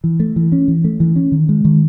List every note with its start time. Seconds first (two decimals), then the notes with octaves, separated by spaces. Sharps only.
0.04 E3
0.20 A3
0.36 E3
0.52 C#4
0.68 E3
0.84 A3
1.00 E3
1.16 C#4
1.32 D#3
1.49 G#3
1.65 D#3